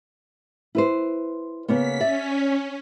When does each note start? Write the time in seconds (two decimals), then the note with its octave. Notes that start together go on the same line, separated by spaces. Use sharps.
0.75 E4 B4 C5
1.68 C#3 A#3 B3 B6
2.00 C#4 D5 E5